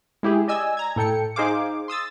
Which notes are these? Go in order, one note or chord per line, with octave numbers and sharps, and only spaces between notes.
G#3 E4 G4 G#4
D5 D#5 G#5 E6
A#5 G#6
A2 A4 G5 C#7
D#4 G#4 C5 F5 D6
C6 D#6 E6 A6